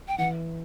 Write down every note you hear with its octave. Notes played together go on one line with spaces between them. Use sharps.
G5
E3 F#5